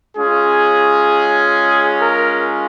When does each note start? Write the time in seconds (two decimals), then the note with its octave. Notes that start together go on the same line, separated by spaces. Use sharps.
0.15 G#3 C#4 F4 G#4
2.00 A#4